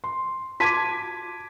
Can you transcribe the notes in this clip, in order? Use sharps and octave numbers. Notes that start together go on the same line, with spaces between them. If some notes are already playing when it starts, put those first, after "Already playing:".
C6
F4 F#4 A5 D6 G#6 B6